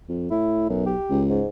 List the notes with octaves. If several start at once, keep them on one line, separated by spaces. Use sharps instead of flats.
F2
A2 E4
B1 F#2
G4
C#2
G#2